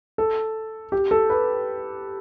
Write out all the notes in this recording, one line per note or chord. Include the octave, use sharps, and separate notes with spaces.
A4
G4
A4
B4